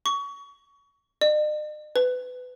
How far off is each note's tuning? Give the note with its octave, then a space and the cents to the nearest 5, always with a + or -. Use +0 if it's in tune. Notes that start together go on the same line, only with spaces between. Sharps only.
C#6 +25
D#5 -45
B4 +25